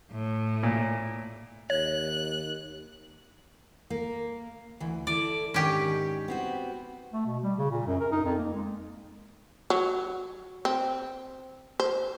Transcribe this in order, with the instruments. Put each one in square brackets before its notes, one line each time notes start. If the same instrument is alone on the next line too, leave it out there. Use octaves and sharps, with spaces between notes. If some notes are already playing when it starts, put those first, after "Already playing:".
[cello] A2
[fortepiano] A#2
[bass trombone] D#2 [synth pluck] C#5 [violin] F#6
[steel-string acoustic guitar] A#3
D2 E3
[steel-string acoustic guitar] E4 A4 [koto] D5
[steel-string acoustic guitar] G#2 D#3 D4 [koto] C#4 G4
[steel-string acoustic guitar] B3 C4 F#4
[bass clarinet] A3
B2
G3
C#3
A#2
F#2
A#4
D#4
F2
A#3
G#3
[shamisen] F#3
C4
C5